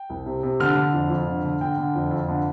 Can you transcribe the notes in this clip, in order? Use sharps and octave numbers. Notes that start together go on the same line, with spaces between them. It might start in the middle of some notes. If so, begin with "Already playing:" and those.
Already playing: G5
C2
C3
C3
D3 F6
D3
F2
F2
D3
D3
D3 G5
D3
F2
F2
D3